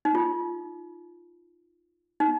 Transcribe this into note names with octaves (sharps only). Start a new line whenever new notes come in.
D#4
F4
D#4